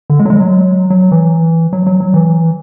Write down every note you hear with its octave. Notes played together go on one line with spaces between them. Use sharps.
D3
G#3
F#3
G#3
F#3
F#3
E3
F#3
F#3
F#3
E3